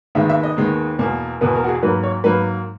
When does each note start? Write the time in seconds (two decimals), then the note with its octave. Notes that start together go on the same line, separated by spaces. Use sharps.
0.15 D#2 D#3 G#3 B3 E5
0.29 E5
0.43 D#5
0.57 D#2 D#3 G#3 B3
0.99 E2 B2 A#3
1.41 E2 B2 A#3 B4
1.55 A#4
1.64 F#4
1.68 G#4
1.82 G#2 F#3 A#3 B4
2.03 C#5
2.24 G#2 F#3 A#3 B4